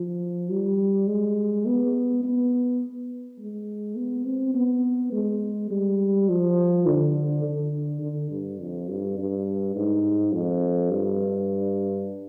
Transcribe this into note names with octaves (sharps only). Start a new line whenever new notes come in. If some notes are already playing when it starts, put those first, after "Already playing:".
Already playing: F3
G3
G#3
B3
B3
G#3
B3
C4
B3
G#3
G3
F3
D3
D3
D3
G2
F2
G2
G2
G#2
F2
G2